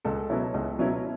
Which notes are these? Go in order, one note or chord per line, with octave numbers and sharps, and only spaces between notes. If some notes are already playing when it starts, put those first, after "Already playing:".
C#2 A4
B2 F#3 C#4 E4
C#2
B2 F#3 C#4 E4